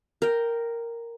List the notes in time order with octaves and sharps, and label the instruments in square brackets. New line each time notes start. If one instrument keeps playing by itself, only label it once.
[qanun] A#4 G5